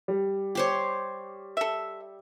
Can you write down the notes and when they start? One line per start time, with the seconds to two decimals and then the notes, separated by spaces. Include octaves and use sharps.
0.08 G3
0.55 G4 C5 C#5
1.57 A4 E5